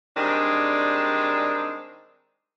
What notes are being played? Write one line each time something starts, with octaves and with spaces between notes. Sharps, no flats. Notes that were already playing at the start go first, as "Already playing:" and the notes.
D#3 G3 G#3 C4 D4